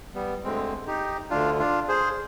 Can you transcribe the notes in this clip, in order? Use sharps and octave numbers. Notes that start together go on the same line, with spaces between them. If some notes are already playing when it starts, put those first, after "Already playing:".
G3 B3
D2 D3 G#3 C4
D#4 G4
D2 D3 D4 F4
D4 F4
G#4 C5